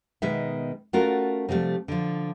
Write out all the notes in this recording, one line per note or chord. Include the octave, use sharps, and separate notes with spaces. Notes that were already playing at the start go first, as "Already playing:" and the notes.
B2 D#3 G#3 D#4 E5
A3 C#4 F4 F#4 A#4
C3 F3 G3 A3
D3 F3